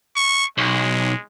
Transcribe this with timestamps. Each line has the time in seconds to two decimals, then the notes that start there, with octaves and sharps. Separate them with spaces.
0.16 C#6
0.58 B1 G#3